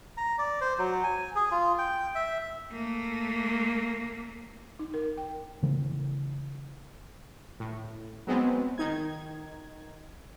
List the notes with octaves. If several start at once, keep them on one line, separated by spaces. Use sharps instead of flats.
A#5
D5
C5
F#3
G#5
G#4
F4
G5
E5
A3 A#3
D#4
A#4
G5
C#3 E3 A3
A2
F#3 G#3 B3 C4
D#3 D#4 G#6